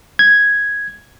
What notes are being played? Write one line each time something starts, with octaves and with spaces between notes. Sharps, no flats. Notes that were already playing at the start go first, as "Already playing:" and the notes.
G#6